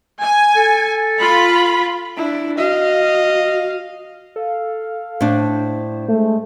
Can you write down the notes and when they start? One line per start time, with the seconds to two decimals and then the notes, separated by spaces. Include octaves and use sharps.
0.23 G#5
0.56 A4
1.21 F4 B5
2.17 D4 E4
2.58 F#4 D#5 F5
4.36 A4 F5
5.21 A2 D4 C5
6.09 G#3 A3